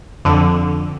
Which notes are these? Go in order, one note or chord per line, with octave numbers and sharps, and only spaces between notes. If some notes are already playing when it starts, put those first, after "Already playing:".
F2 D3